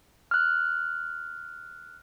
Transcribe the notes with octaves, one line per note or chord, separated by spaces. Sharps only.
F6 F#6